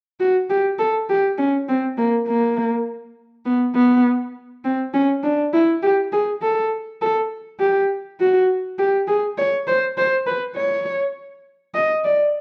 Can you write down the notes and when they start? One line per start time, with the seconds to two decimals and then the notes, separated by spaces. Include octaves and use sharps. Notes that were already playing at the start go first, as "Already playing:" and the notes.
0.20 F#4
0.49 G4
0.79 A4
1.09 G4
1.38 C#4
1.68 C4
1.97 A#3
2.28 A#3
3.46 B3
3.75 B3
4.65 C4
4.94 C#4
5.23 D4
5.53 E4
5.82 G4
6.13 G#4
6.42 A4
7.01 A4
7.60 G4
8.20 F#4
8.78 G4
9.08 G#4
9.38 C#5
9.67 C5
9.97 C5
10.27 B4
10.56 C#5
11.74 D#5
12.04 D5